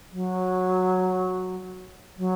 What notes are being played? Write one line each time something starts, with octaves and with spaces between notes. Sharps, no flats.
F#3
F#3